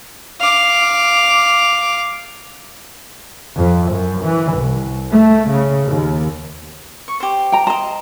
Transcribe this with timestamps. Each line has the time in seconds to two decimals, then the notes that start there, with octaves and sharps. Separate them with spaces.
0.41 F5 D6
3.56 F2
3.92 F#2
4.22 E3
4.54 C2
5.11 A3
5.49 C#3
5.86 D#2
7.08 C#6
7.20 G4 C5
7.52 G5 A#5
7.67 C5 D#5 A#5